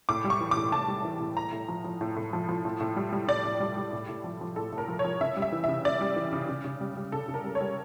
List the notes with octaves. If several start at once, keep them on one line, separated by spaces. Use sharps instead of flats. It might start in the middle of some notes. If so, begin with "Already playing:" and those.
A2 D6
G3
C#6
E3
D6
A2
A2 A5
G3
E3
A2
A2 A#5
A2
F3
F3
A2
A2
F3
F3
A2
A2
G3
G3
A2 D5
A2
G3
G3
A2
A2
F3
F3
A2 A4
A2
A#4
F3
C#5
F3
C#3 E5
G3
E5
E3
C#3 E5
C#3 D5
G3
E3
C#3
C#3
C#3
G3
G3
C#3 A4
C#3
A#4
G3
C#5
G3